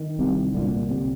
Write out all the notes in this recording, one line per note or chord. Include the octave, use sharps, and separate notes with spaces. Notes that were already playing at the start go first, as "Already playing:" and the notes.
Already playing: D#3
C2 C3
C2 A#2 D3
C3